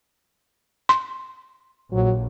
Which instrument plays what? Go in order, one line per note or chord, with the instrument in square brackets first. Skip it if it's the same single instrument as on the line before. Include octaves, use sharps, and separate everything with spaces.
[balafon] C6
[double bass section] A#1 [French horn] F#3